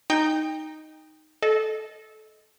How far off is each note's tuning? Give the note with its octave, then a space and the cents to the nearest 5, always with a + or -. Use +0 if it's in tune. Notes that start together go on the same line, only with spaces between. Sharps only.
D#4 +0 G5 +25
A4 -15 D#5 -5